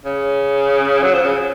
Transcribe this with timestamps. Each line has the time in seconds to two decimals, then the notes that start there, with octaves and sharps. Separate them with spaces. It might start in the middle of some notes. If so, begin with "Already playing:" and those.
0.05 C#3
1.03 F#3
1.14 F3
1.25 C#3